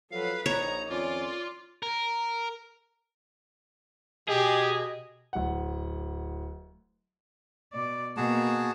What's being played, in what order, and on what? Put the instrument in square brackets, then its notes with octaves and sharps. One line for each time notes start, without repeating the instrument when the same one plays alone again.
[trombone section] F3 F#3 [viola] A4 B4 [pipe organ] F5
[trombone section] A#1 [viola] D#4 [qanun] C#5 [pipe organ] A#5
[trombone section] F2 D#3 C#4 [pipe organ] F4 [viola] D5
[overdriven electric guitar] A#4
[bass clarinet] B2 [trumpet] G4 [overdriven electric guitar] G#4 [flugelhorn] D#5
[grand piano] D1 F#5
[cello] B2 D5
[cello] B2 A#3 [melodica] F#4 G#4 A5